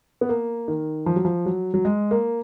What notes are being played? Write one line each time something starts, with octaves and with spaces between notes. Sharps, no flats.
B3
A#3
D#3
F3
F#3
F3
F#3
F#3
G#3
A#3